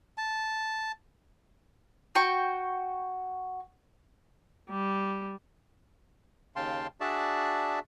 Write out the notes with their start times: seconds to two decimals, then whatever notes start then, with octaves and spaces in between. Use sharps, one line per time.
0.17 A5
2.15 F#4 G5 C#6
4.70 G3
6.56 D#2 C#3 F5 G5 A5 C6
7.01 D4 F#4 G#4 D5 E5 A5